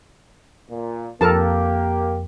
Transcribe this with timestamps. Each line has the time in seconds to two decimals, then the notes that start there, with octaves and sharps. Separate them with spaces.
0.69 A#2
1.21 F2 A#3 G4 A4 A#4 A5